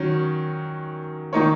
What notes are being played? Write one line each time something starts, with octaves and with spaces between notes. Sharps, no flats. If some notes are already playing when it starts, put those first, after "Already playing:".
Already playing: D#3 F#3 C#4
D#3 A#3 D#4 A#4 C#5